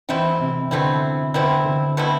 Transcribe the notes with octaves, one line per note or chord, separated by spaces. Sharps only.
B2 E3 A3 C4 E4
C3
B2 D3 A3 C4 E4
B2 D3 A3 C4 E4
D3
B2 A3 C4 E4